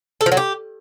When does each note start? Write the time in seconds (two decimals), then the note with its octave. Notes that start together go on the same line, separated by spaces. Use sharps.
0.21 A4
0.26 F3
0.32 F#3
0.37 G4